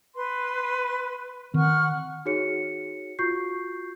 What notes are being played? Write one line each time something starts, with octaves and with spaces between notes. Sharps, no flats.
B4 C6
D#3 C4 F#5 C#6 F6
D#4 F#4 G#4 C#5 C#7
F4 F#4 C#6 G6 C7